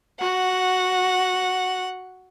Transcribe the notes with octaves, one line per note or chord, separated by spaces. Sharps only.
F#4 F#5